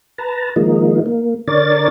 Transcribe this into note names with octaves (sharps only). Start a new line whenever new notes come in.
B4 A5 A#5
D#3 F3 G#3 A#3 D#4
A#3
D3 D4 A#4 C#5 D5 A6